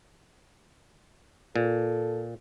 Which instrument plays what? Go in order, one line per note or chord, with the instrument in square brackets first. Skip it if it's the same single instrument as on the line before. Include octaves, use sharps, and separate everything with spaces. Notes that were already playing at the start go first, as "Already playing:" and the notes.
[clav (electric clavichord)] A#2 [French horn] A4